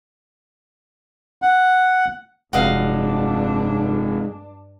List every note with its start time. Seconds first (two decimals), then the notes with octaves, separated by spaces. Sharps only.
1.42 F#5
2.53 F1 G2 G#3 D4 F#4 D#5 F5